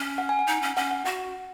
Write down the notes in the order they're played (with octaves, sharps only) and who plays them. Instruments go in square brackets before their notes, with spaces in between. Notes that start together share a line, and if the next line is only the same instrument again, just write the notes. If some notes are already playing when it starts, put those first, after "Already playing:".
Already playing: [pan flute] C#4
[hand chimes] F#5
G#5
F#5
[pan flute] D#4
C#4
[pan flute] C#4 [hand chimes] F#5
[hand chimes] F#5
[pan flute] F#4 [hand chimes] F#5